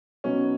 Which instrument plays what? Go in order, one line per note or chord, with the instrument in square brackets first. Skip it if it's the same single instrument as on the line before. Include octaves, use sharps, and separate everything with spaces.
[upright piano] B2 F#3 B3 D#4 F#4 [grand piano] C#4